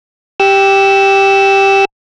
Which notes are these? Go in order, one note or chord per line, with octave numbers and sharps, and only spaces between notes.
G4 E6